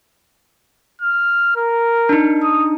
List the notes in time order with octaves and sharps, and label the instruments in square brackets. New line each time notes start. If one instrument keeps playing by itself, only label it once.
[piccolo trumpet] F6
A#4
[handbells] D4 D#4
[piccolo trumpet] D#6